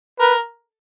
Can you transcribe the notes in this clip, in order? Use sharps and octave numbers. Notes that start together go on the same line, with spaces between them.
A#4 B4